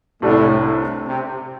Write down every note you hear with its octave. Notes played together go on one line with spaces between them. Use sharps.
C2 A2 C3 A3 D4
C3